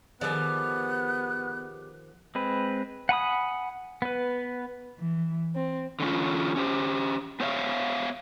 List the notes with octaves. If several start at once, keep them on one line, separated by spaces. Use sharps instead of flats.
D#3 F3 G3 B3 G#4 D5 F#6
G#3 C4 B4
F#5 G#5 B5 D#6
B3 B4
E3
C4
D3 E3 C#4 F4
C#4 G4 C5
B3 C5 C#5 E5 F5